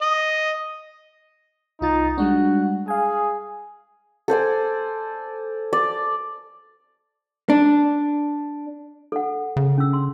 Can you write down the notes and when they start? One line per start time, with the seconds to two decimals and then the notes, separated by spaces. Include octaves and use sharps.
0.02 D#5
1.81 C2 D#4 F4 A6
2.18 G3 G#3 D4 F#4
2.88 G#4 F5 G#5
4.28 A4 C5 D5 G#5
5.73 D5
7.50 D4
9.12 A4 F#5
9.57 C#3
9.78 C#4 E6
9.93 C6